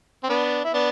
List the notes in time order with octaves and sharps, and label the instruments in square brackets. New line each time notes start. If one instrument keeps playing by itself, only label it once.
[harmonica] C4
B3 D4
E4
B3 D4